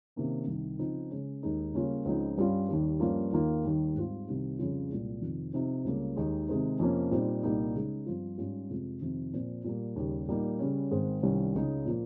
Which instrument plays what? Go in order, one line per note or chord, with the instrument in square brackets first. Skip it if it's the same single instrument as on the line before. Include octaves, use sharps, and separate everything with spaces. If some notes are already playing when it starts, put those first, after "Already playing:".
[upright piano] C3 D#3 A#3 C#4
C2 C3 D#3
C#3 F3 C4 D#4
C#3 G#3 C#4
D#2 D#3 G#3 D#4
C#3 G3 A#3 C#4 F4
C#2 C#3 F3 C4 D#4
G2 G3 C#4 F4
D#2 D#3 G3
G2 F3 A#3 C#4 F4
D#2 D#3 A#3 F4
D#2 D#3 G3
G#2 G3 C4 F4
C2 C3 D#3 G3
F2 C#3 G3 C#4 F4
C2 A#2 G#3
F2 C3 D#3
C3 F3 C4 D#4
C#2 C#3 G3 A#3
D#2 D#3 G#3 D#4
C3 D#3 G#3 C4 D#4
F2 C3 F3 A#3 C#4
A#2 G3 C4 D#4
C2 A#2 G3 A#3 D#4
C#3 G#3 D#4
G2 F3 C4 F4
G#2 G3 C#4 F4
F2 C3 F3 G#3
F2 C3 D#3
A#2 F3 C4
A#2 G3 A#3
D#2 C#3 G3
A#2 G3 A#3 D#4
C#3 G3 C#4
G#2 D#3 G#3 C4
C2 C3 D#3 G3 C#4
C#2 C#3 G#3 D#4
A#2 F3 A#3